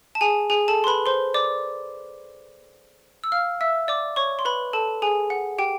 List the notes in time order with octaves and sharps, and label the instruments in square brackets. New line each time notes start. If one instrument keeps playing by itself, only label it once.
[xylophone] A5
G#4 G#5
G#4 G#5
A4 A5
C6
B4 B5
C5 C6
D5 D6
E6
F5 F6
E5 E6
D5 D6
C#5 C#6
C6
B4 B5
A4 A5
G#4 G#5
F#5
G4 G5